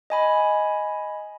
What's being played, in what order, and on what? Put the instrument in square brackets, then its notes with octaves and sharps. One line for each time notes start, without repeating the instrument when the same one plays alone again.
[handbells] D#5 G#5 B5